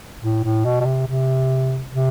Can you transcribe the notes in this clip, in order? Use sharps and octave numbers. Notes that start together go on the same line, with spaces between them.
A2
A2
B2
B2
C3
C3
C3